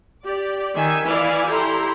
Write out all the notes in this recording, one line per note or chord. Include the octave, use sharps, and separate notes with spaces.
G4 D5
D#3 E5 G#5
E3 E4 D5 F5 G#5
E4 G4 A4 A#5 C6